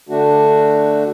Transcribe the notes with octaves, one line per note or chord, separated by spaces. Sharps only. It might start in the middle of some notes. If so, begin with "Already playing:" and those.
D3 A3 D4 F#4